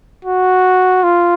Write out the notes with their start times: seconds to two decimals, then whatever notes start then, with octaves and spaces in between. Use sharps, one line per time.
0.25 F#4
1.03 F4